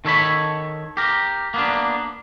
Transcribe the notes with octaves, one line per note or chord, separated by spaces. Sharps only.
D#3 A4 C#5 B5
G4 A#4
A#3 B3 D4